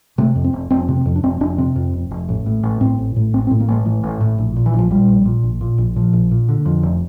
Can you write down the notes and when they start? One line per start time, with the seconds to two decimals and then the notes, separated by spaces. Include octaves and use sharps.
0.18 C3 A3
0.36 F2
0.44 C4
0.53 F1
0.70 F1 C4
0.88 C3
0.96 C4
1.05 F2
1.16 D4
1.23 F1 C4
1.41 F1 D4
1.58 C3 C4
1.76 F2
1.94 F1
2.11 F1
2.29 A1
2.46 A2
2.63 A1
2.81 A2 C4
2.98 A1
3.16 A2
3.34 A1 C4
3.47 C4
3.51 A2
3.60 A#3
3.68 A1 A3
3.86 A2 E3
4.03 A1
4.21 A2
4.38 A#1
4.56 A#2
4.66 E3
4.74 A#1
4.79 F3
4.91 A#2 G3
5.08 A#1
5.26 A#2
5.43 A#1
5.61 A#2
5.78 A#1
5.96 A#2 F3
6.13 A#1
6.31 A#2
6.49 D3
6.66 F2
6.83 F1